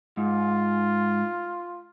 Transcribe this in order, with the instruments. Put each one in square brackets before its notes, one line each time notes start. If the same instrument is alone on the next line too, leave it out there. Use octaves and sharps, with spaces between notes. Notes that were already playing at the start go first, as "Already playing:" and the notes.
[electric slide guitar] G#2 [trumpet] F4